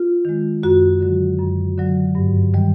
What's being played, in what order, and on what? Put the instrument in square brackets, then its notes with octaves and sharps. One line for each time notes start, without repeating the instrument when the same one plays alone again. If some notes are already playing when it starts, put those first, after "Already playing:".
Already playing: [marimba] F4
D#3 G#3
F#2 F#4
D3 F#3
F#2
D3 F#3
G2
D#3 G3